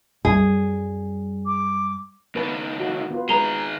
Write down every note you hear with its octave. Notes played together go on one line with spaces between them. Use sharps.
F#2 G3 G#4
D6
C#2 D#3 B3 B4 A5
F#4 A5
B3 F4 B4
D#3 G#3 G#4 B4 A#5 F7 G7